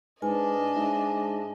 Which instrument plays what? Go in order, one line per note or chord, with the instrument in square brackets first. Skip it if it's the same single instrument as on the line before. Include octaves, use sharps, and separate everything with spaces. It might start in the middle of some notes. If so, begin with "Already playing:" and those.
[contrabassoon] G#2 [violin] D4 D#5 [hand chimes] B4 [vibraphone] G#5
[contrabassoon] G#2 [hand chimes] E5 A5